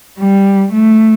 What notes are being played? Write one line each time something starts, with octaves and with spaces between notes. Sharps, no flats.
G3
A3